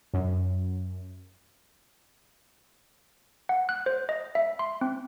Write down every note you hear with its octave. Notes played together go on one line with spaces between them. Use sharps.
F#2
F#5
F#6
C5
D#5
E5
C6
C4